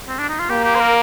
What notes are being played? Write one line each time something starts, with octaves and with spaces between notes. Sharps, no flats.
C4
D4
D#4
F4
A#3 G4
G4
C5
A#4